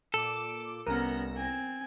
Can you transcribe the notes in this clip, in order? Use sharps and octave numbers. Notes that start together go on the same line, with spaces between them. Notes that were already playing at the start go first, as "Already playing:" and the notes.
A#2 A4 D6
C2 B3 C#4 A#4 A#6
C4 G#5